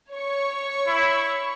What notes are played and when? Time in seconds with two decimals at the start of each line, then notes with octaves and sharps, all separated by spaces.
0.13 C#5 C#6
0.87 E4